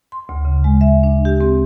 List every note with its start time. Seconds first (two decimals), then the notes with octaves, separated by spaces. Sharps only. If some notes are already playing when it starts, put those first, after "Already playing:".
0.12 C6
0.29 D2
0.45 C#3
0.64 G#3
0.81 E5
1.04 D4
1.25 G4
1.41 C4